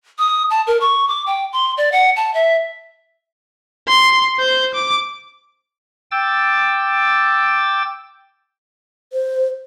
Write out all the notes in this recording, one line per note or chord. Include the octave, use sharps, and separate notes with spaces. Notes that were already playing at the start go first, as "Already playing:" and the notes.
D#6
A5
A#4
C#6
D6
G5
C6
D5
F#5
A5
E5
C6
C5 G6
D6
G5 D6 E6 A6
C5